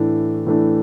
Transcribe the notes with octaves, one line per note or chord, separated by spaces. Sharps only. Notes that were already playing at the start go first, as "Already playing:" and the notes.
Already playing: A2 E3 A3 D4
A2 E3 A3 D4